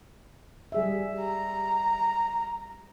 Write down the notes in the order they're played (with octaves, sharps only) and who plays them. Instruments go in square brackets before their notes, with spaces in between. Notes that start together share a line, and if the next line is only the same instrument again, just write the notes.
[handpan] G3 G#4 E5
[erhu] A#5